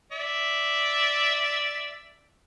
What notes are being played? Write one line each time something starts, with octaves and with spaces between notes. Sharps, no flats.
D5 E5